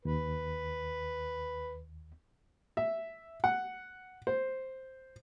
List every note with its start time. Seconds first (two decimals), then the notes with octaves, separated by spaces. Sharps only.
0.05 D#2 B4
2.77 E5
3.44 F#5
4.27 C5